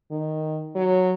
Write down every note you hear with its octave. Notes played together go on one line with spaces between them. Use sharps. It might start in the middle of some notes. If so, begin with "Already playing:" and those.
D#3
F#3